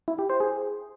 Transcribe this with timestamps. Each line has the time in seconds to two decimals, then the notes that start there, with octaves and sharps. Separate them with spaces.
0.08 E4
0.19 G4
0.30 C5
0.40 G#4